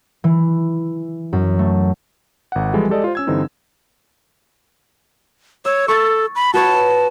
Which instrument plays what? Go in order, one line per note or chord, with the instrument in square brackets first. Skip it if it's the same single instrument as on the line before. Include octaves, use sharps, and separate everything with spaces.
[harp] E3
F#2
A3
[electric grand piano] G#1 F#5
E3 F3 G3 G#3 E4 A4
G#3 G4 A4 D5 D#5
F4 C5
C#4 E6 G#6
G2 D3 E3 C4 D#4
[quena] C#5 [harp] E6
[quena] A4 [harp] C#6 A6
[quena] B5
[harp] F#4 B4 C#5 [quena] A5